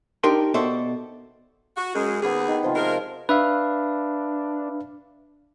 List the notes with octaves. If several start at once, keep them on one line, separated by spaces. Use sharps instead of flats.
D4 D#4 G4 A#4 G5 C6
B2 A4 C5 D5 E5
F#4
F#2 G#3
D#2 B3 G#4 D6
D#3
C3 F3 F4
G#2 G#3 A#4 C6
D4 B4 E5 F5